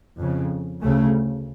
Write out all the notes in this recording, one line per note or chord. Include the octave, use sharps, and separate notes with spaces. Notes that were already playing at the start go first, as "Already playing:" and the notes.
F2 C#3
D2 C#3 A3